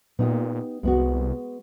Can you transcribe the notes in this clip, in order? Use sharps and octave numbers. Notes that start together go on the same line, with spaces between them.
A#2 B3 D#4 G4
C2 G#3 B3 F#4